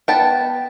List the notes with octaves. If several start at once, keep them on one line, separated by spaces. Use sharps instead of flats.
B3 G5 A5